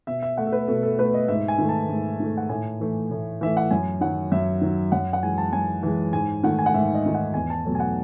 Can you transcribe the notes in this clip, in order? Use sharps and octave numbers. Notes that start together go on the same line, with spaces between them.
B2 E5
E5
A3 F#5
A4
B4
B2 A4
A4
A3 B4
D#5
G#2 E5
G#5
D#3 A3
A5
G#2
D#3 A3
F#5
A2 G#5
E3 A3
A2
E3 A3 E5
F#5
F#2 G#5
D#3 F#3 F#5
F#2 E5
D#3 F#3
F#2 F#5
F#5
E3 G#3 G#5
A5
F#2 G#5
E3 G#3
G#2 G#5
D#3 A3 F#5
G#5
F#5
G#2 E5
D#5
D#3 A3
F#5
E2 G#5
A5
B2 F#3 A3
G#5
F#5